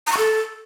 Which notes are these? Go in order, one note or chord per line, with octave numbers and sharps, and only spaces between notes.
A#5
C#6
A4